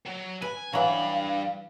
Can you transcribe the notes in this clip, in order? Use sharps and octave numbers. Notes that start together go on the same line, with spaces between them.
F#3
B4 G#5
G2 E3 F#3 F5 B5